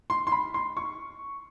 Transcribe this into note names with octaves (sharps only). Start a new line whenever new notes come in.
C6
C6
B5
C6
C#6